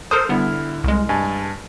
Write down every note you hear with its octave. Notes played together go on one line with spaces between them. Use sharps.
A4 A#4 C5 D#6 F6
D3 G3 B3 E4
C2 G#3
G2 G#5 A5